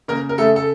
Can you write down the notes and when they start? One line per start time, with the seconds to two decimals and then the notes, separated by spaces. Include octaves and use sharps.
0.08 C#3 A#3 A#4
0.29 A#4
0.38 C#3 A3 A4
0.56 A4